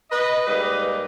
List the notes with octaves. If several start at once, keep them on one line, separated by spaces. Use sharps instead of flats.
B4 D#5
G#2 G3 A#3 B4 D#5